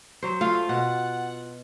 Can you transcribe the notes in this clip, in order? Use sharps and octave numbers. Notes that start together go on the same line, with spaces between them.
F#3 C5
A3 F4 F5
B2 F#5